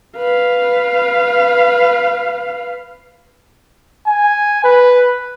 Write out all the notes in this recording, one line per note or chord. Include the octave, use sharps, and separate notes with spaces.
B4 F5
G#5
B4